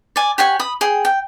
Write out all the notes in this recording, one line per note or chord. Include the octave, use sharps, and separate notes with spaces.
D5 G#5
G4 C#5 F#5 G#5
B5 D#6
G#4 G5
G5